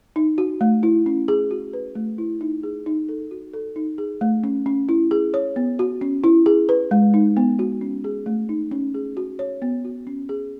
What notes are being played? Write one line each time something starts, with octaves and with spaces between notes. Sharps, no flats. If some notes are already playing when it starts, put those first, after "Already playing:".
D#4
F#4
A3
E4
C#4
G#4
F#4
B4
A3
E4
D#4
G#4
D#4
A4
F#4
A4
D#4
G#4
A3
C#4
C#4
E4
G#4
C#5
B3
F#4
C#4
E4
G#4
B4
G#3
D#4
B3
F#4
C#4
G#4
A3
D#4
C#4
G#4
F#4
C#5
B3
F#4
C#4
G#4